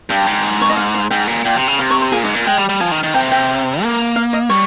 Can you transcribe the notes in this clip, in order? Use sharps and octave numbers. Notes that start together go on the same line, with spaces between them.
G2 G5
G#2
C#5
D#5
F5
F5
G#2 G5
A#2
A#2 G5
C3
C#3
C3 F5
C#5
C5
A#2 G#4
G#2 D#5
A#2 F5
G#3 G5
G3
G3
F3 G#5
D#3
D#3
C3 G5
G5
A#3
F5
D#5
G3 C#5